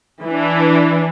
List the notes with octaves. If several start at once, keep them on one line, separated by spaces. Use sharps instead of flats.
E3 D4